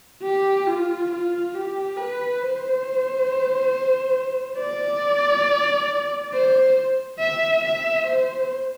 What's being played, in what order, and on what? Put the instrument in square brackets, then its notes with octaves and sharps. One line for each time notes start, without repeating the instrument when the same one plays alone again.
[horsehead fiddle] G4
F4
F4
G4
B4
C5
D5
C5
E5
E5
C5